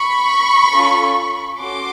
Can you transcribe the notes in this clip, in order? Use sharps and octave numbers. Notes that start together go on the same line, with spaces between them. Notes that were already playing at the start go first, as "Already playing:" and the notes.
Already playing: B5 C#6
C#4 F4 A4
C#4 F#4 A4 C6 D6